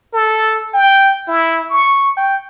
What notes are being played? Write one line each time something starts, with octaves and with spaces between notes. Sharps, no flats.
A4
G5
E4
C#6
G5